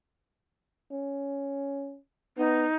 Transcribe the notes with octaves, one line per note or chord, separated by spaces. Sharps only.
C#4
B3 D#4